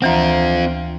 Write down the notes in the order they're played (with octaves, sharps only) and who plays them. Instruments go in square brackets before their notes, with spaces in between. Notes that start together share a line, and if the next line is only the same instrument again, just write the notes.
[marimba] D2 E3 A#5 [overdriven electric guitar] C4 F4